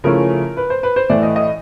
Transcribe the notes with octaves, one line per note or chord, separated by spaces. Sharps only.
C#3 F3 A3 C#4 E4 A#4
B4
C5
B4
C5
A2 E3 A3 D5
D#5
D#5